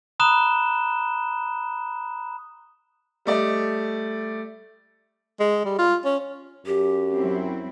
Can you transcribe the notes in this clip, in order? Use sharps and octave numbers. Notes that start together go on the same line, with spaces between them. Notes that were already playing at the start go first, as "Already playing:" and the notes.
A#5 B5 D#6 F#6 E7 G7
G3 A3 D5 D#5
G#3
G3
F4
C#4
F#2 G4
F#3 C4 E4